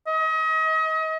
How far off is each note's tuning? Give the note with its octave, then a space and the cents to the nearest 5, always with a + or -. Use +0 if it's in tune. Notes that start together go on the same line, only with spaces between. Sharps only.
D#5 +35